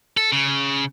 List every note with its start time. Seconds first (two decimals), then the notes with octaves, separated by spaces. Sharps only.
0.17 A4
0.32 C#3